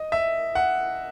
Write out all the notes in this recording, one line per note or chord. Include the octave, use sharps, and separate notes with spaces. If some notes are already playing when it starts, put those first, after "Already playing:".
Already playing: D#5
E5
F#5